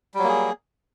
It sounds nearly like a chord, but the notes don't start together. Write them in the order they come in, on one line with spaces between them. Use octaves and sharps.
G3 F#3 A#3 G#4